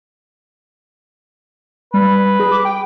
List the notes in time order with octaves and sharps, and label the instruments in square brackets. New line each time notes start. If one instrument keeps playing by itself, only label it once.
[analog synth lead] G3 [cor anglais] B4
[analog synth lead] G#4
D6
G5